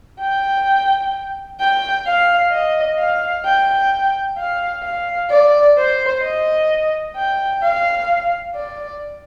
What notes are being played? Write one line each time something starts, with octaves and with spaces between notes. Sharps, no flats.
G5
G5
F5
D#5
F5
G5
F5
F5
D5
C5
D#5
G5
F5
D5